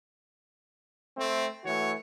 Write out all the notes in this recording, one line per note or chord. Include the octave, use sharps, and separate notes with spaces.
A3 C4
E3 A3 F#4 C#5